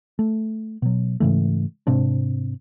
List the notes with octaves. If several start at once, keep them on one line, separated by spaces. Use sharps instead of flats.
A3
B2 F#3
G#2 C#3 E3 A3
G#2 C3 C4 D4